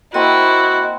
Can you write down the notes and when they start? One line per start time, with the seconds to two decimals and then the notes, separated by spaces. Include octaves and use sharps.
0.14 A#3 C4 E4 F#4 D#5 F#5